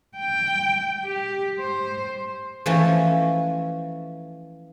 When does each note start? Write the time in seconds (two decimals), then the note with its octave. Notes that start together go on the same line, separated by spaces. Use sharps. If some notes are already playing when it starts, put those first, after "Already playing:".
0.17 G5
1.06 G4
1.59 C5
2.66 E3 F3 A3 C#4 C#5 A5